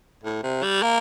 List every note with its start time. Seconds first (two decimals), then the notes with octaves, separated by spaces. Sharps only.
0.24 A2
0.43 C3
0.63 G3
0.83 A#3